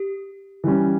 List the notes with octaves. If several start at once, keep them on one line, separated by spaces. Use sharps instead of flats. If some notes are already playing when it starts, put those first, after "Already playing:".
Already playing: G4
E3 G3 C#4